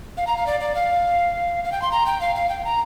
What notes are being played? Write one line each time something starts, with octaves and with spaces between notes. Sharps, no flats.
F5
A#5
F5
D5
D5
F5
F5
G5
C6
A#5
G5
F5
F5
G5
A#5